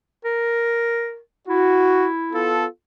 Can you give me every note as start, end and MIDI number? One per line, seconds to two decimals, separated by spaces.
0.25 1.19 70
1.49 2.55 64
1.49 2.07 66
2.33 2.66 59
2.33 2.66 65
2.33 2.66 69